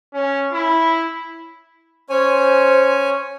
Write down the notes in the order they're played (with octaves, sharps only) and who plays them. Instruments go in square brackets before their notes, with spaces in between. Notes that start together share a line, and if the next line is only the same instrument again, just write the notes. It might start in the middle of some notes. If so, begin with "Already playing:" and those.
[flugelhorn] C#4
E4
[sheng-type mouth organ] C#4 C#5 G#5 [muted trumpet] C5